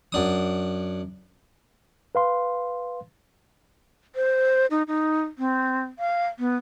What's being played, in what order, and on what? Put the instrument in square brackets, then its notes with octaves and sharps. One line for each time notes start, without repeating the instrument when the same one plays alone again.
[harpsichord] F#2 D4 D#6
[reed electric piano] B4 F5 C6
[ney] C5
D#4
D#4
C4
F5
B3